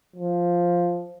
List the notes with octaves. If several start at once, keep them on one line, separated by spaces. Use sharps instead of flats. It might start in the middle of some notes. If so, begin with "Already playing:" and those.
F3